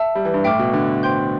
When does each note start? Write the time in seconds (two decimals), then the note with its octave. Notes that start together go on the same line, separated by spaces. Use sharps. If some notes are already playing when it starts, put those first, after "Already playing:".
Already playing: E5 A5 E6
0.15 G3
0.25 E3
0.34 G2
0.44 A2 E5 G5 D6 F6
0.59 B2
0.73 D3
1.03 C5 G5 C6 G6